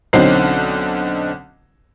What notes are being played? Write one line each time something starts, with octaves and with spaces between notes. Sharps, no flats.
B1 D3 C4 C#4 D#4 C7